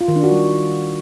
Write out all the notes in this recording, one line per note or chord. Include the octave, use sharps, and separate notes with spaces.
F4
D#3
D4
F#4
G3